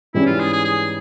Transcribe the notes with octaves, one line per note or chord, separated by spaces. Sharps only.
G#2 E3 G3 C#4 E4
F4
G#4
G#4
G#4